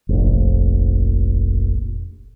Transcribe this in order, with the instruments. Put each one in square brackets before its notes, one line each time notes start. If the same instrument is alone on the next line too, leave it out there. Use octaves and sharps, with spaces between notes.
[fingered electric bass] F1 A#1